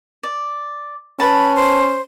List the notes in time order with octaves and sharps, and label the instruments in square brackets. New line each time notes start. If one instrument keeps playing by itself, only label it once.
[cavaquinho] D5
[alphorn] C#4 [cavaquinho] B4 A5 [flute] B5
[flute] C5